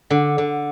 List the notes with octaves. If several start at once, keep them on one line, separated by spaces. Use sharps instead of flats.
D3
D3